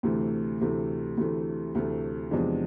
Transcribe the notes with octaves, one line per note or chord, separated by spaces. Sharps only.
D2 C3 E3 A3
D2 C3 E3 A3
D2 C3 E3 A3
D2 C3 E3 A3
E2 C3 F3 G#3 D4